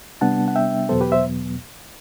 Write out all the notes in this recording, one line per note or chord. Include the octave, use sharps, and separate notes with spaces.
C3 G3 B3 D4 F#5 A5
F#5
E5 G5
E2 B2 F#3 B3 A4 C5
G4 B4
C5 E5